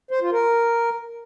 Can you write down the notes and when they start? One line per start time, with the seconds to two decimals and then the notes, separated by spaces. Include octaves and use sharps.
0.11 C5
0.22 F4
0.32 A#4